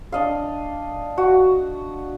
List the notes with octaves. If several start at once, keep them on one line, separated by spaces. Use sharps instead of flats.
D4 D#5 F5
F#4